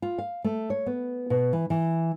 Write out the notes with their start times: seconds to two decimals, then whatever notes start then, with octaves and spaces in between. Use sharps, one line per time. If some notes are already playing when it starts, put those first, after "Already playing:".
0.02 F4
0.18 F5
0.44 A3
0.70 C#5
0.86 B3
1.30 B2
1.53 E3
1.70 E3